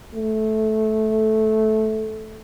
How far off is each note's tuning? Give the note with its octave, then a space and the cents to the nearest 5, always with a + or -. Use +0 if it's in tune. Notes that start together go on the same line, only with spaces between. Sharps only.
A3 -15